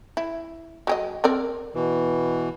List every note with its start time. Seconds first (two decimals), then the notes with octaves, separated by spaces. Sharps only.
0.17 E4
0.87 F#3 G4 D#5
1.24 C4 A#4 D5
1.75 B2 E3